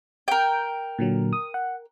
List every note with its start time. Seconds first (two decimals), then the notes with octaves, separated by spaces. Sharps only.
0.28 A#4 G5
0.99 A#2 D3 F#3
1.33 D#6
1.54 F#5